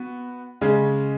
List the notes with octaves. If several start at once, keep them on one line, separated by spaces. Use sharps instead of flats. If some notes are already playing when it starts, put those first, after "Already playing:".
Already playing: B3 F#4
C#3 G#3 C#4